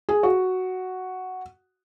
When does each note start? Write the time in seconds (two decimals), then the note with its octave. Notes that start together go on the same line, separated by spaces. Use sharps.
0.09 G#4
0.23 F#4